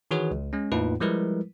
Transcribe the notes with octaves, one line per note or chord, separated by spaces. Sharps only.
D#3 E3 F#4 G#4 B4 C#5
C#2
G#3 C#4
E2 A2 A#3 D#4 F4 B4
F3 G3 G#3 E4 A#4 B4